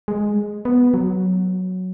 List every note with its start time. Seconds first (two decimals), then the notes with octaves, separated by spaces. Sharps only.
0.08 G#3
0.65 B3
0.94 F#3